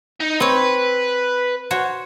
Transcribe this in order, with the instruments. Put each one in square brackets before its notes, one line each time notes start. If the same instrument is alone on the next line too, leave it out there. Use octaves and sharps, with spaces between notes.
[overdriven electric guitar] D#4
[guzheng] C4 C#5 [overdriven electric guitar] B4
[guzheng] F#4 C5 C#5